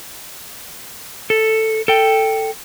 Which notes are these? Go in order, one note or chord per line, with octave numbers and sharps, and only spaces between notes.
A4
A4 G5